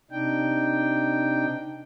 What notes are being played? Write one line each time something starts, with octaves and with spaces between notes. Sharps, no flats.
C3 D4 D#4 G5